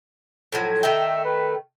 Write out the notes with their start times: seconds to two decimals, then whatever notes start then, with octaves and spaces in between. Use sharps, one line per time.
0.52 A2 F3 F#3
0.83 D#3 A3 E5 G5
1.24 B4